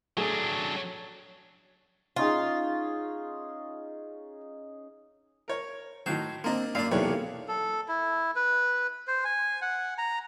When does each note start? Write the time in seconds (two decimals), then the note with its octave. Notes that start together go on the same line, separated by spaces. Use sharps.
0.17 F#3 A3 D4 G#4 A4
2.16 C#4 D#4 F4 G#4
5.48 A#4 C#5
6.06 A2 D#3 F#3 C5
6.44 A#3 C4 D4 D#5 A#5 C6
6.75 F#2 A#3 D4 D5 F5
6.92 B1 E2 C3 D4 B4 C#5
7.48 A4
7.88 E4
8.36 B4
9.07 C5
9.25 G#5
9.62 F#5
9.98 A#5